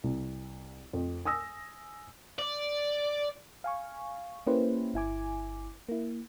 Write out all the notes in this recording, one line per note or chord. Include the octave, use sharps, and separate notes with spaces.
C2
F2
G#5 D#6 E6 A#6
D5
F5 G#5 C#6
A#3 C#4 E4 G4 B4 C5
G1 E4 G#5 D6
A#3 E4